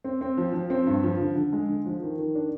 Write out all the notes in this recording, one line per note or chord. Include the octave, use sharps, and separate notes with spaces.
C4
C4
F3
F3
C4
G2
F3
D3
D3
G#3
D3
F3
D#3
D#3
D4